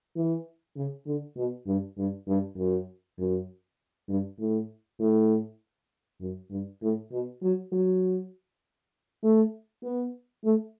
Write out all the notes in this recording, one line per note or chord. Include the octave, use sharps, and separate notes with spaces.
E3
C#3
D3
B2
G2
G2
G2
F#2
F#2
G2
A2
A2
F#2
G2
A2
B2
F#3
F#3
A3
B3
A3